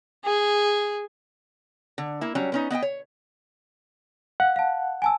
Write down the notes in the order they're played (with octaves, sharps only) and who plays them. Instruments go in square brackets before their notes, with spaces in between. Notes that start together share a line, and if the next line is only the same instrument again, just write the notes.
[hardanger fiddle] G#4
[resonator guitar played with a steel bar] D3
A#3 E4
F#3 G3 C#4
B3 C#4 D#4
B3 D#5 E5 G5
C#5
[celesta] F5 [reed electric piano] F#5
[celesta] F5 A5
G#5 A5 E6